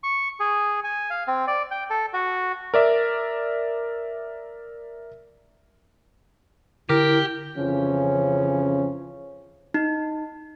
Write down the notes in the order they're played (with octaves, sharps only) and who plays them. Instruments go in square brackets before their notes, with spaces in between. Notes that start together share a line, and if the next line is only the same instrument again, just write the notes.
[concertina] C#6
G#4
G#5
F5
C4
D5
G5
A4
F#4
[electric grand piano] A#4 D5 E5
[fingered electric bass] D3 [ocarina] E4 [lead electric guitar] G4 [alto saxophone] A#4
[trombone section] F2 C#3 E3 F3 C#4
[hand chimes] D#4